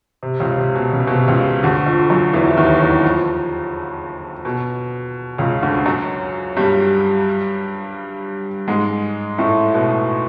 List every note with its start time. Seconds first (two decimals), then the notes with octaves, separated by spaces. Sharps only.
0.23 C3
0.40 C#2 C#3
0.57 C3
0.75 B2
0.93 C#3
1.00 C3
1.07 B2
1.15 C3
1.28 C#2 C#3
1.63 D2 D3
1.86 F2 F3
2.10 F#2 F#3
2.34 E2 E3
2.50 E3
2.57 D#2 D#3
2.81 E2 E3
3.04 F2 F3
4.45 B2
5.38 C#2 C#3
5.63 D2 D3
5.86 F#2 F#3
6.57 G2 G3
8.68 G#2 G#3
9.38 A2 A3
9.74 B2 B3